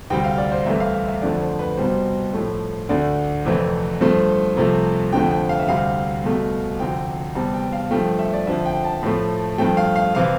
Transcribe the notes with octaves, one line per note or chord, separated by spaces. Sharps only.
D2 C3 G3 G5
F5
D5
C5
C2 C3 E3 A3 E5
F5
E5
E5
F2 D3 F3 A3 D5
C5
B4
C2 B2 G3 C5
A2 F3 A3
D2 D3 A3 D5
F2 C3 E3 A3
G2 F3 A3 C5
C2 C3 F3 A3
F2 D3 F3 A3 G5
G5
F5
E5
D2 C3 G3 F5
C2 B2 A3
D2 C3 F3 G5
E2 C3 G3 A5
G5
F5
G2 F3 A3 G5
E5
D5
F2 D3 F3 E5
G5
A5
A2 F3 A3
G2 F3 A3 G5
F5
F5
C3 E3 F5